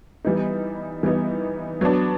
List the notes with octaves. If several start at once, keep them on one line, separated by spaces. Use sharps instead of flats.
E3 G3 B3 D#4
E3 G3 B3 D#4
F#3 B3 D4